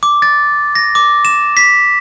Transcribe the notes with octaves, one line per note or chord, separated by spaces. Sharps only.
D6
A6
A#6
D6
E7
B6